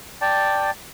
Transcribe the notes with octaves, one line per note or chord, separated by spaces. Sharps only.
D5 G5 A5